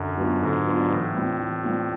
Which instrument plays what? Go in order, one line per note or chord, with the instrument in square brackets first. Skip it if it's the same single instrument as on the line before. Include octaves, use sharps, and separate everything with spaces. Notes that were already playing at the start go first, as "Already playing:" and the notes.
Already playing: [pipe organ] F#2 [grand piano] D3
[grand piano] F#3 B3 D4 F4
[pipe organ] G#2 [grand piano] D3
[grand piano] F#3 B3 D4 F4
[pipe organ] A2 [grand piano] E3
[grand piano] G3 C4 F4
E3
G3 C4 F4